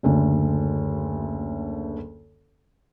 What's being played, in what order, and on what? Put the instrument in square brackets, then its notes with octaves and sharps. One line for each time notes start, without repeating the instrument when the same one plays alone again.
[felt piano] F#1 D2 D3